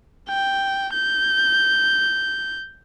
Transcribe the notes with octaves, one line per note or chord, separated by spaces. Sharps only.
G5
G6